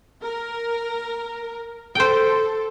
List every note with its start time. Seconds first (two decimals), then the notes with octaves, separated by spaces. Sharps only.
0.22 A#4
1.95 A4 C5 G5